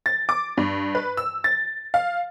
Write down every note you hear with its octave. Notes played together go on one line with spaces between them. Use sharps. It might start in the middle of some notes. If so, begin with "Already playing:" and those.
A6
D6
G2
B4
E6
A6
F5